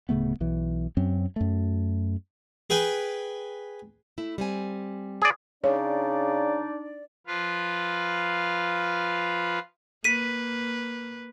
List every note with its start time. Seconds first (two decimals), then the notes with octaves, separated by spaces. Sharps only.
0.09 D1 C#3 A3 B3
0.40 B1 E3
0.97 F#2 F#3 C4 C#4
1.36 F#2 A3
2.70 G#4 B4 G5 G#5
4.18 A3 E4
4.38 G3 C4 G#5
5.22 G#4 C#5 D5
5.64 C#3 D4 D#4 C#5 D5
7.27 F3 F4 B4 F5
10.04 A#3 B4 B6 D#7